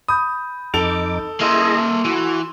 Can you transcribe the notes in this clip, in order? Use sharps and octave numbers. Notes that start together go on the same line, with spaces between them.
B5 D#6 G6
F2 D#4 A4 D6 F7
A#3 E4 G#4 D#5 E5 C6 E6 D#7
E3 F#4